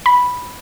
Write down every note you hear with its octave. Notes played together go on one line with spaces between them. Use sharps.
B5